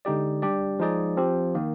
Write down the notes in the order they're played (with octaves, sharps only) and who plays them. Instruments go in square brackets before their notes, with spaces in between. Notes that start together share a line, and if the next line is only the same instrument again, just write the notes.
[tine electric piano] D3 G#3 D#4 G4 D5
G3 D4 G4 D5
F3 G#3 D#4 G#4 D5
F3 C4 G4
D#3 A#3